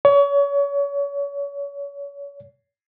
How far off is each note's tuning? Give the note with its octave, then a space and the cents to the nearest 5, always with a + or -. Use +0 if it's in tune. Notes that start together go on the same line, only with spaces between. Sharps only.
C#5 +35